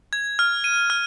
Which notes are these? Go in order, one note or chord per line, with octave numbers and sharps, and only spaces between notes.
G#6
F6
D#7
F6